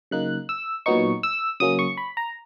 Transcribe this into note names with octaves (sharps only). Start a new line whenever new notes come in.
C#3 F#3 A#3 D#4 F#6
E6
A#2 F#3 B3 D#4 C#6
E6
C#3 F#3 A#3 C#4 D#6
C#6
B5
A#5